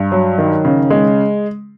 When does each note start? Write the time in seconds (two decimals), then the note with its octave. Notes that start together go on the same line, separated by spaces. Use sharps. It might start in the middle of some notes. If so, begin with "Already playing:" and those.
Already playing: G2
0.12 F#3
0.38 D#3
0.65 C#3
0.90 G#3